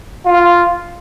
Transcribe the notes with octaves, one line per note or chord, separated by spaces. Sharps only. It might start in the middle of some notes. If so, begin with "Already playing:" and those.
F4